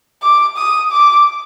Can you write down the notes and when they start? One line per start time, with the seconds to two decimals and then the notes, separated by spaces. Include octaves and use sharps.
0.23 D6
0.57 D#6
0.91 D6